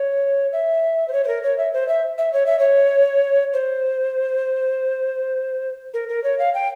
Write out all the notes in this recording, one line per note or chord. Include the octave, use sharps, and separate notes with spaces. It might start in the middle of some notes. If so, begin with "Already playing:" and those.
Already playing: C#5
E5
C5
C#5
C5
A#4
C#5
E5
C5
E5
E5
C#5
E5
C#5
C5
A#4
A#4
C#5
F5
G5